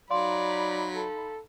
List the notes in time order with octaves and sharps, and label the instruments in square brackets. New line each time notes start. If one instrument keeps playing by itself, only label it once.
[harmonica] F#3 [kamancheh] D#4 B5 [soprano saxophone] D5 [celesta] F5 C6
[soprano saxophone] A4